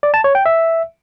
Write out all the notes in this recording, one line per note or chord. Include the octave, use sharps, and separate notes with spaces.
D5
A5
C#5
G5
E5